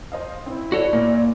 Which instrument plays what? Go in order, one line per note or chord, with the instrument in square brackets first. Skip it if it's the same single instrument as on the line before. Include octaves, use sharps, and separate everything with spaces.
[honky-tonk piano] C5 D#5 F5
[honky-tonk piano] C4 [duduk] E4
[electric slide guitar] F#4 A4 C#5 [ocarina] D5
[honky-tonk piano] A#2 C#5 [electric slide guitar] A#3